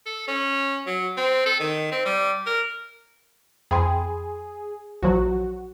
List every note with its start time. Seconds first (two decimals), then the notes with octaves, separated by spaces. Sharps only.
0.06 A4
0.28 C#4
0.87 F#3
1.17 C4
1.46 A4
1.60 D#3
1.92 C4
2.06 G3
2.46 A#4
3.71 F2 G#4 G5 B5 C6
5.03 A#1 F3 F#3 F#4